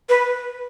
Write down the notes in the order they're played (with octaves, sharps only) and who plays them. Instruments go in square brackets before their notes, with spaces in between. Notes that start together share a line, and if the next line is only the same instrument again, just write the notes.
[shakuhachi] B4